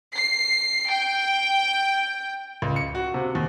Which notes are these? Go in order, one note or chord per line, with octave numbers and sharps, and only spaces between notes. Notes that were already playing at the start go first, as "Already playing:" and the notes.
C7
G5
C#2
C#7
F#4
C3
D#2